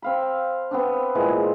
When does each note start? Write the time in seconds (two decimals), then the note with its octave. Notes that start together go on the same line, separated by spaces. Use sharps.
0.02 C4 F5 B5
0.71 B3 C4 D4
1.15 A#2 E3 G#3